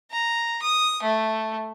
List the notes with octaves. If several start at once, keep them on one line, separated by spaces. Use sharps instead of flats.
A#5
D#6
A3